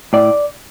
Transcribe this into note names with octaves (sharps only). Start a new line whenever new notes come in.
A2 D5